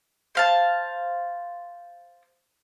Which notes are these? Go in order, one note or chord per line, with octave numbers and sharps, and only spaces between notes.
C5 F5 A5